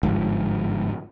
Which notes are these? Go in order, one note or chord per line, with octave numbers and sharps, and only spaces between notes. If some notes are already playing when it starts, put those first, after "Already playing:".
G1 G#2 F3